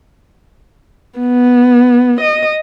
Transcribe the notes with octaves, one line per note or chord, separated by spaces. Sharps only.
B3
D#5